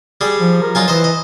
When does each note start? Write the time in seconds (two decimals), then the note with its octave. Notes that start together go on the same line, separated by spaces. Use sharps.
0.21 G3 G#4
0.40 F3
0.62 A#4
0.75 F#3 D#4 F4 G#5
0.88 E3 C5 D#5
1.04 D#5